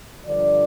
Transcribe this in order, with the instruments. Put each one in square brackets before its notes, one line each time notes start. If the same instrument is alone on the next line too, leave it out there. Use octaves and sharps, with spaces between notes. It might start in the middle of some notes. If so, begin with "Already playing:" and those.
[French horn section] G2 D3 F3 D5